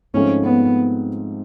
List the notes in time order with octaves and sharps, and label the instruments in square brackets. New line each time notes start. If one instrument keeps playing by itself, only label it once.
[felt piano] G#2 F3 A3 C4 [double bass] C#4
[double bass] B3